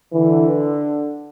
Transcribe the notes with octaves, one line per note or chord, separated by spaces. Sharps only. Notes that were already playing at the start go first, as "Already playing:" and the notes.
D3 E3